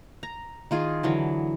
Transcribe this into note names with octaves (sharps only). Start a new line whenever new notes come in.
A#5
D#3 F4 G#4
D3 E3 F#3